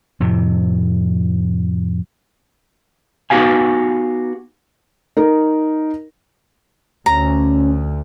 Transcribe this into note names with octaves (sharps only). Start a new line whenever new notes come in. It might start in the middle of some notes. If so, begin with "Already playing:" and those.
F2 A2 C3
B3 D#4 F#4 G4 F5 G#5
D#4 A#4
D2 C#4 A#5